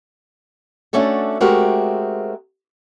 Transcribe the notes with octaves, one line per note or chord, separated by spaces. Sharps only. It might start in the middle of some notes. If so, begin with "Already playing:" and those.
A3 C#4 D4 F#4 A4
G#3 A3 C4 F#4 G4 A#4